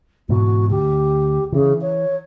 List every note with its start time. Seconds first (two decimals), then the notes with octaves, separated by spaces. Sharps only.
0.29 G#2 B2 E3 F#4
0.70 D2 G4
1.53 C#3 E3
1.81 C#5